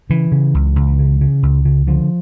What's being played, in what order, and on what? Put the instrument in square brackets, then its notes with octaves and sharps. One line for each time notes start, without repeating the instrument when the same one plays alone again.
[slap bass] C#3 E3
C#3
C#2
C#2
C#3
C#3
C#2
C#3
D3 F3